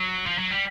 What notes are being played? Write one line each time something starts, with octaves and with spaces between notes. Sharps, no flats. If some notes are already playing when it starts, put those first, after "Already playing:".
Already playing: F#3
F3
F#3
G3